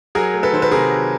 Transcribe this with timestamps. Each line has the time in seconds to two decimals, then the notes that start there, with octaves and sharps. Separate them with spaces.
0.15 F#3 G#4 A#4
0.34 A3
0.43 A4 B4
0.53 D#3 C5
0.62 B4
0.71 C3 G#4 A#4
0.91 F#3